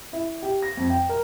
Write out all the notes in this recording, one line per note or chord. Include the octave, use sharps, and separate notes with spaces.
E4
G4
A#6
F2
G5
A#4